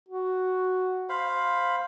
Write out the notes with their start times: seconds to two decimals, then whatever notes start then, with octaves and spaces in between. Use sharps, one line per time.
0.09 F#4
1.09 C5 F5 B5